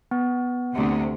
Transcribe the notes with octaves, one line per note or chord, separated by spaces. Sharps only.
B3
D2 C3